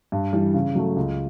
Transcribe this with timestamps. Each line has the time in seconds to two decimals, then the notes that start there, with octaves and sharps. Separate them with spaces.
0.12 G2
0.33 E3 G3
0.54 C#3
0.75 F#3 A3
0.96 C#2